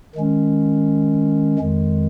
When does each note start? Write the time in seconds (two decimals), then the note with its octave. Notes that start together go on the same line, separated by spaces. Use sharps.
0.16 D#3 G#3 C#4
1.59 F2 D#3 G#3